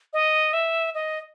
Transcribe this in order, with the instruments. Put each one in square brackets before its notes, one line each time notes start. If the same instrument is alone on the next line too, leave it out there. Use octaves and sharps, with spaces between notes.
[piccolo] D#5
E5
D#5